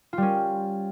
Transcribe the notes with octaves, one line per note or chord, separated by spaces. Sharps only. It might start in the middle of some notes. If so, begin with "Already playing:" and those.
G3 C#4 F4